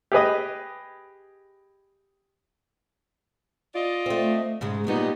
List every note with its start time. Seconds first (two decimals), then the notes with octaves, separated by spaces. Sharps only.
0.12 G4 G#4 B4 D#5
3.74 F4 D5 D#5
4.06 A3 C4
4.61 G#2 C#3 G#3
4.87 A#2 F#3 G3 B3 D#4